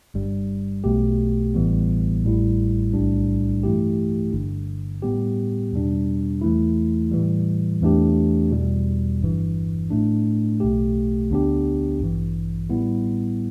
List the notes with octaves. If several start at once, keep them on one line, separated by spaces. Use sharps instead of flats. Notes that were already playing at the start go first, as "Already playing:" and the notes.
G1 G2 G3
B1 B2 A3 G4
A1 A2 E3 G3 B3
A1 A2 G3 E4
B1 A2 G3 D4
G2 E3 A3 E4 G4
G1 G2 D3
A2 G3 B3 G4
E2 B2 G3 D4
E2 E3 A3 E4
A2 E3 G3
E2 E3 A3 D4 G4
E2 B2 G3
G1 G2 E3
A2 A3 D4
B1 B2 A3 G4
D2 D3 B3 D4 G4
A1 G2 E3
A2 G3 B3 E4